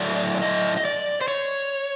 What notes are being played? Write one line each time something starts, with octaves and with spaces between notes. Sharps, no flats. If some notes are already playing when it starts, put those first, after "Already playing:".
Already playing: A2 F#3 A3 D5
D#5
D#5
D5
C5
C#5